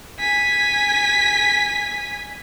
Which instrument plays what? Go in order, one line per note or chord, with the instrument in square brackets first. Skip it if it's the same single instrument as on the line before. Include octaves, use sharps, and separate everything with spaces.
[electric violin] G#5 B6